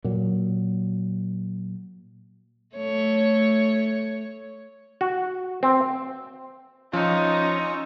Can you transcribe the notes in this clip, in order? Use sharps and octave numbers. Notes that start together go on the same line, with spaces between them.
A#2 F#3
A3 C#5
F#4
C4
F3 C#4 D#4 F4 C#6 E6